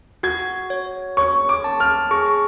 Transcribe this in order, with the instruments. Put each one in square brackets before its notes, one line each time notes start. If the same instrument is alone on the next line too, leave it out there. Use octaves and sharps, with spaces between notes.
[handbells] F#4 [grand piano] G#6
[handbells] C#5
[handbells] C#5 [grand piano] C#6
[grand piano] D6
[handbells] A5
[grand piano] F6
[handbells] G#4 [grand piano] C#6